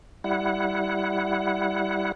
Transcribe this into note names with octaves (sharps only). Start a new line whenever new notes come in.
G3 E4 F#5